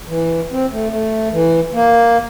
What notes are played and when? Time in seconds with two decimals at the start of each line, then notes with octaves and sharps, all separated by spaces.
0.08 E3
0.51 C4
0.72 A3
0.91 A3
1.32 E3
1.73 A#3